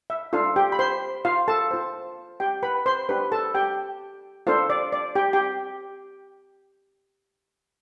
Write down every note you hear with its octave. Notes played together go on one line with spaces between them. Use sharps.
E5
D4 F4 A4 F5
G4 G5
B5
C5 C6
F4 F5
A4 A5
F4 C5
G4 G5
B4 B5
C5 C6
D4 G4 B4 C5 B5
A4 A5
G4 G5
D4 F4 A4 C5 F5
D5
D5
G4 G5
G4 G5